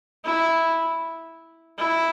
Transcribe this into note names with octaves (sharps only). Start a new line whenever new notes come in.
E4
E4